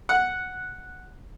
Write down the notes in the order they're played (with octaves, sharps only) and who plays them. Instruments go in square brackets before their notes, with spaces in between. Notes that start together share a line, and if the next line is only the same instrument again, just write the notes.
[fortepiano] F#5